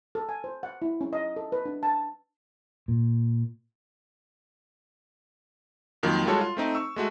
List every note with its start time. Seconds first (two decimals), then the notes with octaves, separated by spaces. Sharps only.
0.15 A4
0.29 G#5
0.44 C5
0.63 F#5
0.82 E4
1.01 C#4
1.13 D#5
1.36 A4
1.52 B4
1.66 D4
1.83 A5
2.88 A#2
6.03 F2 D#3 F#3 A#3 F4
6.26 G3 G#3 F4 F#4 A4 C#5
6.41 F4
6.57 A3 C4 D#4
6.75 C#6 E6
6.96 G#3 A3 F#4